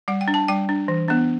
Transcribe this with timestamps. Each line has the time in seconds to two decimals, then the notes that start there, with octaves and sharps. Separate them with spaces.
0.08 G3 F#5
0.21 G5
0.28 D4
0.34 A5
0.48 G3 G5
0.69 D4
0.88 E3
1.08 B3 D4